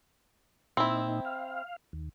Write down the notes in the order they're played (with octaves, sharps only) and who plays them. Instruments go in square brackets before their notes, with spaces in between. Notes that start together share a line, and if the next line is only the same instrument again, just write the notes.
[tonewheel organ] A#2 D#4 [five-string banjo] C4 E4
[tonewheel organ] F5
D#2